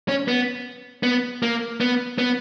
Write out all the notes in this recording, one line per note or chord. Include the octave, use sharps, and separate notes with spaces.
C#4
B3
B3
A#3
B3
B3